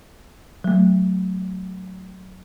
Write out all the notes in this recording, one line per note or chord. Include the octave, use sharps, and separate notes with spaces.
F#3 A3